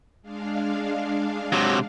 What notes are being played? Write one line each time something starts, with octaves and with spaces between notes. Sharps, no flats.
G#3 D4 F5
C3 F#3